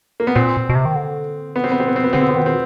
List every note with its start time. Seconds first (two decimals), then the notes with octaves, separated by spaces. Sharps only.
0.20 A#3
0.27 B3
0.35 A#2 C4
0.69 B2
0.75 C3
0.85 D#3
0.96 D3
1.56 B3
1.64 C4
1.72 B3
1.80 C4
1.88 B3
1.96 C4
2.04 B3
2.13 D3 C4
2.21 B3
2.29 C4
2.35 D#3 B3
2.46 C4